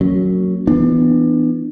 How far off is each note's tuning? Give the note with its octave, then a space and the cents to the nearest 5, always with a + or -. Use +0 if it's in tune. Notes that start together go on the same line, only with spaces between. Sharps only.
F#3 +0 A#3 -25 C#4 +0
E3 +0 B3 +0 D4 +25